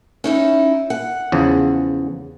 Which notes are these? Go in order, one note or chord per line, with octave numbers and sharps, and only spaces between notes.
C#4 D#4 E4
F#5
E2 C#3 F3